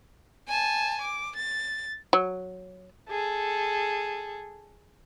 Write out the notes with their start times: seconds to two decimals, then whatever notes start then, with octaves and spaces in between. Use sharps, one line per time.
0.48 G#5 A5
1.01 D6
1.36 A6
2.13 F#3
3.09 G#4 A4